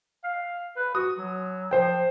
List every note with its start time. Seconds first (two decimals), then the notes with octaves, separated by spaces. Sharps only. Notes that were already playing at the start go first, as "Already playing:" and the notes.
0.24 F5
0.76 B4
0.95 F#4 D#6
1.18 F#3
1.71 F3 C5 G5